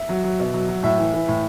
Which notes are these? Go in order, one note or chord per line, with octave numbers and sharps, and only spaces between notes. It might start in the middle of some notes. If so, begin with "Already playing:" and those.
Already playing: E5
F#3
F#3
B2
F#3
F#3
A2 E5
E3
E3
A2